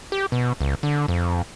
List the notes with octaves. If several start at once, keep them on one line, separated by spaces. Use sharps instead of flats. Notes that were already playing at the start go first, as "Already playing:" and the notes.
G4
B2
C#2
D3
F2